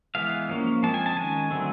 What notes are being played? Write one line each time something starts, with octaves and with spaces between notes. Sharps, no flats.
E3 G#3 B3 F5
F3 A#3 C#4
F3 G#3 C4 A5
G#5
A5
D#3 G#3 C#4 G#5
D3 F#3 A3 C4